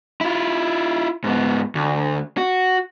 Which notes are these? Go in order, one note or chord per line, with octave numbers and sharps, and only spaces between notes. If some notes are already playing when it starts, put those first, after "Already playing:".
E4 F4
G#2 B3
D2
F#4